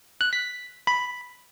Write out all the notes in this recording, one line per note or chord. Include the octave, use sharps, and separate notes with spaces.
F#6
B6
B5